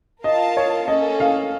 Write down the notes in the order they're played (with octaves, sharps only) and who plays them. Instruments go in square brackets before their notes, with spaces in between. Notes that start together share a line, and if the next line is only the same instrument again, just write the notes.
[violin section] F4 A#4 F5 A5 [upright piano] D#5
[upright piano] C#5
[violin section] A#3 C#4 A4 [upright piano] D#5
[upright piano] F5